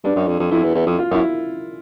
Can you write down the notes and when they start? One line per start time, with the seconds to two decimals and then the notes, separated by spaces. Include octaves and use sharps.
0.04 G2 D4
0.16 F#2
0.27 F2
0.40 F2
0.51 F2 E4
0.64 E2
0.75 E2
0.86 F2
0.99 F4
1.11 F#2 E4